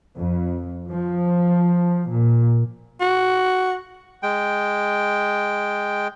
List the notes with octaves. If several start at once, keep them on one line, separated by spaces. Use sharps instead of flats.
F2
F3
A#2
F#4
G#3 G5